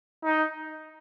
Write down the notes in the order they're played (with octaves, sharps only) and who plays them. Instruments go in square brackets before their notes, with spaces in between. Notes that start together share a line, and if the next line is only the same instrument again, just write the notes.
[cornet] D#4